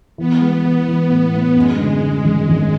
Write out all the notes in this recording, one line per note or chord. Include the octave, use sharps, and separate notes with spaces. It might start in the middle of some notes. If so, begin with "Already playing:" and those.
E3 B3
G#3
E3
E3 B3
A2
A2
F#2 G#3
D3
D3
G#1
G#1